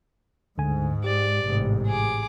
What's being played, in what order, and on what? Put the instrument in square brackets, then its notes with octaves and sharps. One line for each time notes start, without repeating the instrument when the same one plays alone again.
[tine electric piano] D2 D3 G#5 [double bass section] G#2
[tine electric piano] G4 [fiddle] D5
[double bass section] A1 G#2 C3
[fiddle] G#4 D6